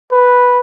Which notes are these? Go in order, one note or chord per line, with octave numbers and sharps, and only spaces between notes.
B4